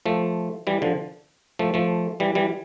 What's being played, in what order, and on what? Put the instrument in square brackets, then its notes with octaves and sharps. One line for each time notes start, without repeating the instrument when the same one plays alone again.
[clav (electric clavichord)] F3 A3
E3 G3
D3 F3
F3 A3
F3 A3
E3 G3
E3 G3